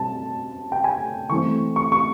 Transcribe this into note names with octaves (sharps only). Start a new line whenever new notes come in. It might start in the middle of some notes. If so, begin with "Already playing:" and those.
Already playing: B2 G3 C4 A5
G5
G#5
E3 A3 C4 C#6
C#6
C#6